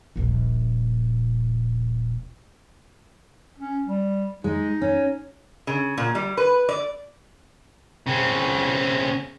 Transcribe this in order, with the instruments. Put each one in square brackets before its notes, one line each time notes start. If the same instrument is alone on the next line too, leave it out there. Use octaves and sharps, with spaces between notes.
[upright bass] D#1 A#1
[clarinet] C#4
G3
[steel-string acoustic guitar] G#3 [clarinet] D#4
[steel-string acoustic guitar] C#4
[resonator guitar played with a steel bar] C#3
A#2
G3
B4
D5
[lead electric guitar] C#3 C4